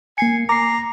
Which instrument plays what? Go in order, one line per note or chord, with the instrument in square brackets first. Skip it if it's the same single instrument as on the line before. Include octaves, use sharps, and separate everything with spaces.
[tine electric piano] A#3 C7 C#7 [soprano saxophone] G#5
[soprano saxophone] A#5 [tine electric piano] D6 C7